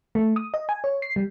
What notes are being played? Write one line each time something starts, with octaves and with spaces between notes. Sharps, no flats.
A3
D#6
D#5
G#5
C#5
C7
G3